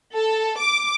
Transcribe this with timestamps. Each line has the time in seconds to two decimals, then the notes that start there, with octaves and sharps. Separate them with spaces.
0.15 A4
0.59 D6